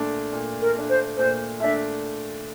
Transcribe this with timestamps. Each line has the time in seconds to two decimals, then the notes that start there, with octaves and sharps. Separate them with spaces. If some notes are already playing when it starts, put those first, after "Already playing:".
Already playing: A#2 A3 D4
0.32 A#2
0.61 A#4
0.75 A3 D4
0.89 C5
1.17 A#2 C5
1.60 A3 D4 E5